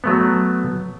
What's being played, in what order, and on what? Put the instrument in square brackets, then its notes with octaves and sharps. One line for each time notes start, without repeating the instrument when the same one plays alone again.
[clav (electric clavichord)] F#3 A3 B3